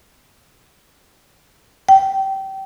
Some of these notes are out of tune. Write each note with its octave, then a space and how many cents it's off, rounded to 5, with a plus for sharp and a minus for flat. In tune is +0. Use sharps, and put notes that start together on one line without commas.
G5 -25